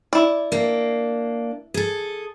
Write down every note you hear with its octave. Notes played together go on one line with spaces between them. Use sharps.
E4 D5
A#3 D4
G#4 A4